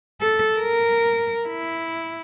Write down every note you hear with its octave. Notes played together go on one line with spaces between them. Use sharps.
A4
A#4
E4